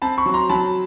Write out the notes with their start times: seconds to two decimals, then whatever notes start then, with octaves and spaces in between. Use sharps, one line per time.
0.02 C4 A5 B5
0.18 B5 C#6
0.26 F#3
0.34 A#5 C6
0.49 F#3 A5 B5